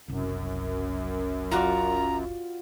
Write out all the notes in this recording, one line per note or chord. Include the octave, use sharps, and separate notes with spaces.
F#1 C2 F#2
F4 F#4 D5 A#5